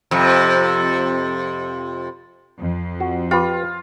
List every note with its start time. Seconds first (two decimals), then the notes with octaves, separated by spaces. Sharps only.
0.11 F2 C3
2.60 F2
3.00 F#4
3.31 F4 G4 B4